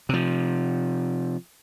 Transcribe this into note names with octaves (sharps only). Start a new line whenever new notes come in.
C3 F3